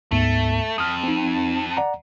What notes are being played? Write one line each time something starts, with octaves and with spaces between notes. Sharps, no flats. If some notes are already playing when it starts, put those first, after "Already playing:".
D2 G#2 A3 B3
F2 D#6 F6
C4 D#4
D5 F#5 A#5